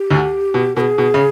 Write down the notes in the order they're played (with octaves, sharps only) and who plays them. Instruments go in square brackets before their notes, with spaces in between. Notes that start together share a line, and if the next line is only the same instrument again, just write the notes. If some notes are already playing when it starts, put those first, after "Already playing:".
Already playing: [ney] G4
[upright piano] D2 D3
B2
[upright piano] B2 [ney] A#4
[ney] G#4
[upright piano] B2
C#3